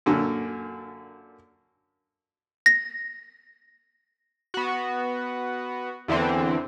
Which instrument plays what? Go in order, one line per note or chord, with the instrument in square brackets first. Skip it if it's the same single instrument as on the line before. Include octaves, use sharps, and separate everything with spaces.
[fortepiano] F#2 A#2 D3
[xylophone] A#6
[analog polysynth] B3 F#4
E2 D3 E3 C4